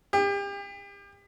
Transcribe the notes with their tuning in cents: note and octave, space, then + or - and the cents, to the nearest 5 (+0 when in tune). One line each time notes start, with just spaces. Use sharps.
G4 +35